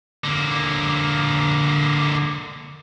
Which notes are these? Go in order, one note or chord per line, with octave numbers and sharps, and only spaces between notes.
D3 A#3